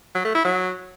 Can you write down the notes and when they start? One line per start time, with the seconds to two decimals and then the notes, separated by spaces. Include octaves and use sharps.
0.15 F#3
0.25 A3
0.35 E4
0.45 F#3